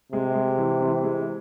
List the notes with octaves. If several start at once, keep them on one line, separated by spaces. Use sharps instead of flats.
C3 G#3
G#3
E3
E3
G#3